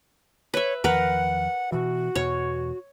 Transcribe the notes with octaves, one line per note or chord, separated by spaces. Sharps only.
B4 C#5 E5
E2 D#3 F3 A#4 B4 F#5
B2 E3 F#4
E2 B2 C#5